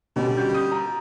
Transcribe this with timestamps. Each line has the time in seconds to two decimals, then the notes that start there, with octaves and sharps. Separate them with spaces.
0.16 B2 D3 G3 C#4
0.37 F#4 G6
0.54 D#6
0.72 A#5